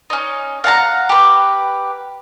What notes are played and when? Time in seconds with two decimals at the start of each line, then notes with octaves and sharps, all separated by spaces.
0.10 C#4 D#4
0.64 F5 F#5 A5 A#5
1.09 G4 B4